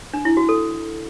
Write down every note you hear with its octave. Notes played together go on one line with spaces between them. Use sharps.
D4
E4
F#4
A4